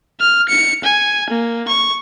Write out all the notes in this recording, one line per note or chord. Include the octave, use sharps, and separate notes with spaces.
F6
C#7
G#5
A#3
C#6